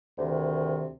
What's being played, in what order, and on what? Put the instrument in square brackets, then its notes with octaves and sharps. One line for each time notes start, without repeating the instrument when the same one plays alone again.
[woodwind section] D2 C3 D#3